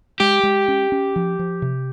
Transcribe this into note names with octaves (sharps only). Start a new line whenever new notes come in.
G#3 G4
G#3
C#4
C#4
F3
F3
C3